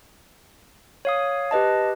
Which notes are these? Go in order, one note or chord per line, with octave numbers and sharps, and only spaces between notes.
C#5 F5 D#6
G4 B4 D#5 A5